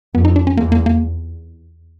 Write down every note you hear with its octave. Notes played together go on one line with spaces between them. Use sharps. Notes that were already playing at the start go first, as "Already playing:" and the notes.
F2 B3
D#4
D4
C#4
E2 A#3
A#3
A#3